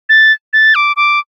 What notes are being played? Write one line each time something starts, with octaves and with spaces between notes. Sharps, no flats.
A6
A6
D6
D6